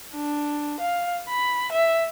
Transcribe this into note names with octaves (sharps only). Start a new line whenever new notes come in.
D4
F5
B5
E5